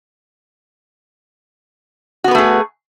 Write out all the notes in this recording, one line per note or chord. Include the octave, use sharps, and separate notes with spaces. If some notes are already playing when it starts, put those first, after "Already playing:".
A3 B3 F#4 G#4 B4